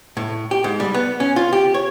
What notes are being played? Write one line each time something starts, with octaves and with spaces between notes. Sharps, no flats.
A2
G4
G#2
G3
B3
C#4
F4
G4
C#5